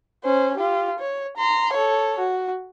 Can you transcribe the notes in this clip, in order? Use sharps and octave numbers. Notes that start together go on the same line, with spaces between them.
C#4 C5
F4 G4
C#5
A#5 C6
A4 C#5
F#4